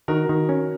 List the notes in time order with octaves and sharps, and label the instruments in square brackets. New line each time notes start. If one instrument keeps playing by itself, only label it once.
[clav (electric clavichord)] D#3 [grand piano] F#4 A#4
[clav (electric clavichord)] D#3
C#4